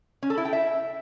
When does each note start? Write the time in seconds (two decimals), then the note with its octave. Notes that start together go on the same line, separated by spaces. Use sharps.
0.22 C#4
0.30 A4
0.38 E4
0.45 G5
0.53 E5